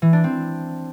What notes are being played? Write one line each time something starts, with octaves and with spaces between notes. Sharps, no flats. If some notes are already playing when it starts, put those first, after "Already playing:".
E3
D4
C4